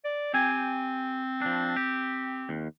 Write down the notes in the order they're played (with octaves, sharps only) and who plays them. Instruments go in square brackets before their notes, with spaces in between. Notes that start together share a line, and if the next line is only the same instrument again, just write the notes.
[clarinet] D5
[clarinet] C4 [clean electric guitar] G4 G#5
[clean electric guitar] F3 D4
G4
D#2